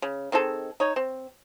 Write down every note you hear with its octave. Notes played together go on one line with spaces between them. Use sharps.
C#3
D#3 C4 G#4 A4
D#4 C#5
C4